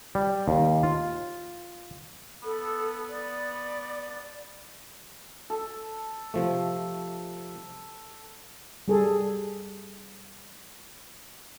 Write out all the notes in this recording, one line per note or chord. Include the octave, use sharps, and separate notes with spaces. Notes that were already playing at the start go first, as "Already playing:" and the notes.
G3
D#2
F4
B3 A4
D5
A4
C3 F3 A3
G3 G#4 A4